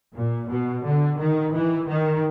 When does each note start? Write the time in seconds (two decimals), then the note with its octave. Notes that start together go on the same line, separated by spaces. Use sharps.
0.15 A#2
0.49 B2
0.84 D3
1.19 D#3
1.53 E3
1.87 D#3